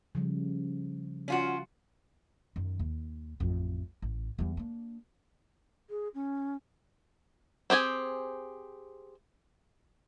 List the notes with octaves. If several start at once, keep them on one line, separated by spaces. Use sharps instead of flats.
C#3 F3 G3
C#4 F4 F#4
F#2 D#3
D#2
A1 F2
A1
E2 G3
A#3 D4
G#4
C#4
C4 G4 G#4 G#5